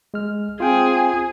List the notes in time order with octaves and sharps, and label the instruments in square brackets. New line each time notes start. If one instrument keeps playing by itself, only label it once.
[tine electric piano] G#3 F6
[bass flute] C4 [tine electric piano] F4 G5 G#5 [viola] G#4